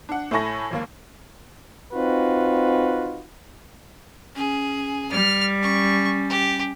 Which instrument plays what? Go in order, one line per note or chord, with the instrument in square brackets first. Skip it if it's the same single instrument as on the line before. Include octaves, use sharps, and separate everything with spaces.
[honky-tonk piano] D4 F#5
A2 E4 A4 G#5 C#6 A#6
G#1 D#2 A#3
[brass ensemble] C4 D#4 F4 F#4 B4
[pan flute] C#4 [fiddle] G#4
[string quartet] G3 [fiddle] F6
[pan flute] C#4 [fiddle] C#6
[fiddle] G4